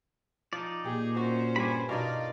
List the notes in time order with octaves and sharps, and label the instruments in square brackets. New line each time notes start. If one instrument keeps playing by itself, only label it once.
[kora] F3 [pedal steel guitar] D#4 D5
[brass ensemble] A#2 [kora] G4 [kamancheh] G#4
[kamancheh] C#4 C5 [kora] F#4
[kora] G2 D5 [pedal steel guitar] G#5 B5
[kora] B2 D4 D#4 [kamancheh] F4 D5 [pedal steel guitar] A#4